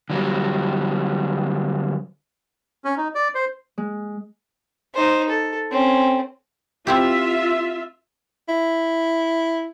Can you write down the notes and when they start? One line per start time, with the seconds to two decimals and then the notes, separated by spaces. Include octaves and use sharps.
0.10 D3 F#3 G3
2.84 C#4
2.97 D#4
3.15 D5
3.35 C5
3.78 G#3
4.94 D#4 C5
5.29 A4
5.72 C4 C#4
6.87 C4 E4 F4 G4 E5
8.49 E4